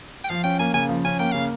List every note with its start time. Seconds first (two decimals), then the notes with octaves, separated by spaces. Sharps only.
0.24 G5
0.29 F3 F5
0.44 C#4 G5
0.59 A#3 G#5
0.74 C#3 G#5
0.89 F3
1.04 C#4 G#5
1.19 A#3 G5
1.32 C#3 F5